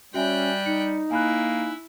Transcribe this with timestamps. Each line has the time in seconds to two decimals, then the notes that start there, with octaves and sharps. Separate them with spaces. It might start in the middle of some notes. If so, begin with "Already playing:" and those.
0.14 G3 C#4 F#4 E5 G5 G#5 F#6
0.66 D#4 C#7
1.11 A#3 E4 G#5 B5 F#6